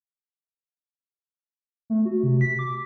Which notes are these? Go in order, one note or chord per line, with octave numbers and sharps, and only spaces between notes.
A3
F#4
C3
B6
D6